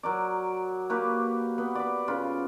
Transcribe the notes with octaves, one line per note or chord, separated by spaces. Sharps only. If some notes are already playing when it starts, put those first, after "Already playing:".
F#3 A#4 D5
A#3 F#4 G4 B4
B3
B4 D5
C#3 F4 B4